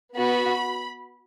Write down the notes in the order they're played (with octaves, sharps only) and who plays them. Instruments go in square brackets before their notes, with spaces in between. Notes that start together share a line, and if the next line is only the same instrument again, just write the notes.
[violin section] B3 F#4 B5